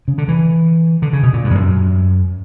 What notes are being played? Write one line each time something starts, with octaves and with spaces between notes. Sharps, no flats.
C#3
D3
E3
D3
C#3
B2
A#2
G2
E2
F#2